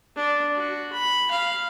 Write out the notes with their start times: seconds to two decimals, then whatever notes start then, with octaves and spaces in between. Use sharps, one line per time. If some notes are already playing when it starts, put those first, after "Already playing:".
0.16 D4
0.56 F#4
0.93 B5
1.31 F5